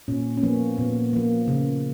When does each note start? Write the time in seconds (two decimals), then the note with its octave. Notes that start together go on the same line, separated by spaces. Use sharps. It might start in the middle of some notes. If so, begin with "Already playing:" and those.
0.08 A#2 C#4
0.37 C#4
0.43 F3 A#3 B3
0.78 A#2 B3
1.13 F3 A#3
1.48 C#3